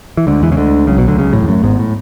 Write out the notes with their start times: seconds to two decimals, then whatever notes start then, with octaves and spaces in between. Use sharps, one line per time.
0.17 E3
0.27 D2 D3 G#3
0.42 E2 E3
0.52 C#3
0.57 D2 D3
0.87 C#2 C#3 F#3
0.97 B1 B2
1.08 D2 D3
1.17 C#2 C#3
1.33 A1 A2
1.42 E2
1.48 F#2 A3
1.63 G#1 G#2 B3
1.79 A2